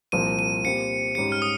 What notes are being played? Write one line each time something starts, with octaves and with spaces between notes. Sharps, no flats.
C2 A#2 F3 C4 D#7
D#7
A#2 G3 C4 C#7
G#2 G3 C#4 G4 C#7
F6
D#6